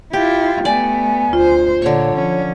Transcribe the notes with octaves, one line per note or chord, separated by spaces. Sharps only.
E4 F4 G4
A3 B3 D5 G#5
D2 F4 C5
A#2 D3 C#5 C#6
F3 C#4